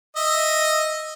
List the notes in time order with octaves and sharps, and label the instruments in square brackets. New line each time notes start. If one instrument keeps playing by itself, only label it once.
[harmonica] D#5 E5